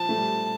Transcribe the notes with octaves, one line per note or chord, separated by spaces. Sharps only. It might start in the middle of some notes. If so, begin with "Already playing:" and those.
Already playing: F3 A5
A3
G3